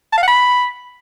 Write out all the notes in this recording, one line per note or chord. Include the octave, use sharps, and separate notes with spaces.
A5
F5
F#5
B5